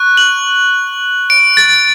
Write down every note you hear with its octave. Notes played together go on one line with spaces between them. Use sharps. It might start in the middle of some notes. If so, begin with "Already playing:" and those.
Already playing: C#6 F#6
F#7
D7
A6